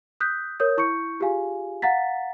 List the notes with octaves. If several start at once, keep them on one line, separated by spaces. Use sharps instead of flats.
D#6 F#6 G6 B6
A#4 C#5 D#6 G6
E4 C#6 G6 C#7
F4 G4 G#4 F5 G#5
F5 F#5 A#5 A6 B6